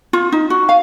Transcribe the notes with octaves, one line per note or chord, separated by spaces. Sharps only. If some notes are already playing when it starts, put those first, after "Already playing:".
F4
D#4
F#4
F5